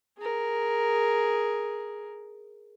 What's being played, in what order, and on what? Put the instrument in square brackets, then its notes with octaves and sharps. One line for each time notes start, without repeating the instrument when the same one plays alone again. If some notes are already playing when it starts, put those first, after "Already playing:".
[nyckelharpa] G#4 A#4